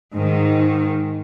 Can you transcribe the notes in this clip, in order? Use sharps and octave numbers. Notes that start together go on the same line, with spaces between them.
G#2 D#3